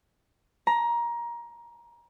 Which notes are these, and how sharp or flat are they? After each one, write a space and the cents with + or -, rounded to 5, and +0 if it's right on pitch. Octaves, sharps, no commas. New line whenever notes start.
A#5 +20